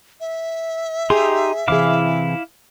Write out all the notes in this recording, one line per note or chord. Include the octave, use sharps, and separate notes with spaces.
E5
D#4 G4 G#4 C6
C3 E3 E4 G#4 F5 D6